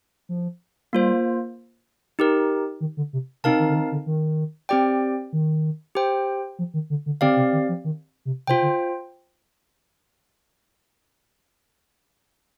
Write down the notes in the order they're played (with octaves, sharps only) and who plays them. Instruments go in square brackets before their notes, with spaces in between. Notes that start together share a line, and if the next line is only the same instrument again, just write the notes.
[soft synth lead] F3
[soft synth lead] G3 [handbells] A#3 F4 C5
[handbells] D#4 G4 A#4
[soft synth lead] D#3
D3
C3
[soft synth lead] C3 [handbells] C4 D#4 A#4 F5 A5
[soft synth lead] D#3
D3
D#3
D3
D#3
[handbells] C4 G4 D5 G5
[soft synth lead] D#3
[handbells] G4 C5 G5
[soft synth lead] F3
D#3
D3
D3
[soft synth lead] D3 [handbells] C4 G4 D5 F5
[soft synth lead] C3
D#3
F3
D#3
C3
[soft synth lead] C3 [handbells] F4 C5 G5
[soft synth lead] D3